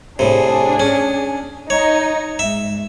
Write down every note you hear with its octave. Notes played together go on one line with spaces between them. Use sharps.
A2 C3 D4 G#4
C#4
D#4 C#5
G#2 E5